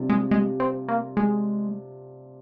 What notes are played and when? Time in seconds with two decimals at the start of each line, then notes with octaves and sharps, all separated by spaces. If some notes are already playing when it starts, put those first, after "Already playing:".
Already playing: C3 G3 D4 F4
0.09 G#3
0.31 G#3
0.60 C4
0.88 A#3
1.17 G#3